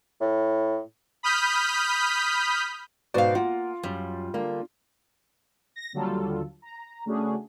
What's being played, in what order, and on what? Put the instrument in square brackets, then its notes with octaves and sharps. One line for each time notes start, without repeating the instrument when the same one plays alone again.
[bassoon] A2
[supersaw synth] B5 D#6 F6 G6 B6
[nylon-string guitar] G#2 B2 B3 [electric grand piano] F#4 D5 [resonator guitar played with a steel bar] C5 F5
[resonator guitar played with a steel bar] A#3 [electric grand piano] F4 [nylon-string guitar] F#5
[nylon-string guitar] F#2 [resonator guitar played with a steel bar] G3
[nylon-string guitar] D3 A#3
[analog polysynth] A#6
D#2 D3 F#3 G3 F4 A4
A#5
C#3 A3 C#4 D4 F#4 G#4